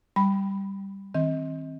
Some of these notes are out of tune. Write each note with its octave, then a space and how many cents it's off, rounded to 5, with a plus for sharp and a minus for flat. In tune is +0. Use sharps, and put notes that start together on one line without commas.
G3 +0 B5 +0
D#3 +25 C4 +20 D#5 +30